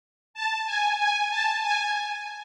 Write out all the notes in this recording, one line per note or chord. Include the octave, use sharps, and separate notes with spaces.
A5
G#5
G#5
A5
G#5